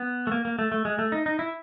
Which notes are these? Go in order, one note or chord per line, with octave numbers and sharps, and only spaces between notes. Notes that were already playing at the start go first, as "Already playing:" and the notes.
Already playing: B3
A3
A#3
A#3
A3
A3
G#3
A3
D#4
D#4
E4